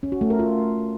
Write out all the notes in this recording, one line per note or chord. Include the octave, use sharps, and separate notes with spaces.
C#4
F#4
A3
A#4
F4